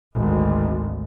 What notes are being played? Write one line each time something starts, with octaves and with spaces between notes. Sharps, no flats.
G#1 D2